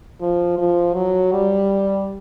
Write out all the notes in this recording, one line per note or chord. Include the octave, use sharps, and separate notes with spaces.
F3
F3
F#3
G3